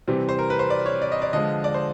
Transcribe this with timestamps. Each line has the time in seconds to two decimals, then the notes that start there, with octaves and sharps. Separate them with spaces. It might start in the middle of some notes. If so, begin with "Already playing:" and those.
0.08 C3 E3 G3 C4
0.29 C5
0.39 A#4
0.50 B4
0.59 C5
0.70 D5
0.86 C#5
1.02 D5
1.12 D#5
1.22 D5
1.33 D3 F3 G#3 D#5
1.64 D5
1.74 C5